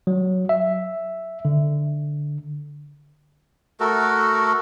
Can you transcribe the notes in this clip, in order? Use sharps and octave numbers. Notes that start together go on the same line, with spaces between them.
F#3
E5
D3
A3 F#4 A4 A#4